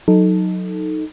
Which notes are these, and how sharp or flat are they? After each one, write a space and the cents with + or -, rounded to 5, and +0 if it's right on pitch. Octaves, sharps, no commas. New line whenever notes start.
F#3 -15 D#4 +0 A4 +0